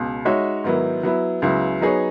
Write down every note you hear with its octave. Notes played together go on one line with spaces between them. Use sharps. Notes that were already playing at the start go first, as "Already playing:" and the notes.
Already playing: C#2 B2
G#3 D#4 F#4 C#5 E5
G#2 D#3 F#3 B3 E4
F#3 B3 E4
C#2 C#3 F#3 B3 E4
F#3 B3 D#4 G#4 C#5